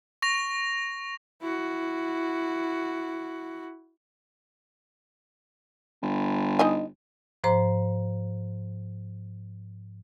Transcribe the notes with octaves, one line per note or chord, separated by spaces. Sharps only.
C#6 A#6 F7
E4 F#4
G1
D#4 D#5 G#5
G#2 F3 C5 A#5